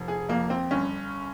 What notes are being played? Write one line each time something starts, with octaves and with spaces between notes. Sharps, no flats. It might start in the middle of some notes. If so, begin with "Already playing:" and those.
Already playing: F1
G#4
F2 A#3
C4
G1 C#4